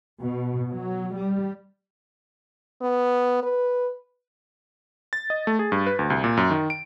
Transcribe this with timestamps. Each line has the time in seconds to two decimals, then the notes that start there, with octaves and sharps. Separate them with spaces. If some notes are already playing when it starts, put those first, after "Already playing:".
0.21 B2
0.72 F#3
1.17 G3
2.82 B3
3.43 B4
5.13 A6
5.30 D#5
5.47 A3
5.59 G#4
5.72 G2
5.87 B4
5.99 D2
6.10 C2
6.24 A#2
6.37 F#2
6.50 D#3
6.70 D7